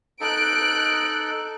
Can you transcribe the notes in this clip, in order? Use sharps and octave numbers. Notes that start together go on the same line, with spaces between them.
D#4 A4 F#6 D7